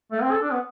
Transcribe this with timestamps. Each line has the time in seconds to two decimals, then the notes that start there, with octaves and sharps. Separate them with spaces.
0.12 A3
0.22 C4
0.32 A4
0.42 D4
0.51 B3